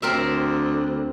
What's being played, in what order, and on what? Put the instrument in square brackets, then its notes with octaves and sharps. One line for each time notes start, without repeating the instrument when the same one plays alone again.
[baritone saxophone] D2 [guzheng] C4 A#4 E5